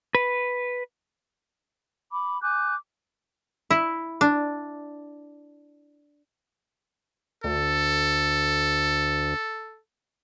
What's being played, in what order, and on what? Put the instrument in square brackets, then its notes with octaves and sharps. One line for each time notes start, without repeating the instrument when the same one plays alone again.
[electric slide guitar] B4
[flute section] B5 D6
G#5 D6 F#6 G6
[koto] E4
D4
[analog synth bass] D2 [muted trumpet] A4